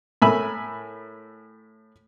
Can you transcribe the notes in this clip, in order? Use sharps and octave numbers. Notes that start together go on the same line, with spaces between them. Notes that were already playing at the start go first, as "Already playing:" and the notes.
A2 A#4 E5 G#5 B5 E6